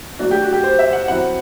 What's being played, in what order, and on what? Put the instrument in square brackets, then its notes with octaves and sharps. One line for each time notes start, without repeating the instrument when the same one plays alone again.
[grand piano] F#3 A3 D4 F#4
G4
F#4
G4
C5
E5
F#5
F#3 C4 E4 F#5